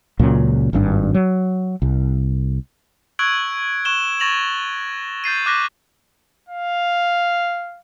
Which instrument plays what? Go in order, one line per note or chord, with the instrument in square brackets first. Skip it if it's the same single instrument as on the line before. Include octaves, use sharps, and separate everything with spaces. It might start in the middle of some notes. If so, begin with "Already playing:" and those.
[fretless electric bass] C#2 A#2 C#3 F#3
G#1 G2 D4
F#3
C2
[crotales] C#6 E6 F#6 G#6 D7 F#7
C#6 F#6 E7 G7
C#6 A6 A#6 F7 F#7
G6 A6 C7 D#7
D6 F#6 A#6 B6
[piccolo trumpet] F5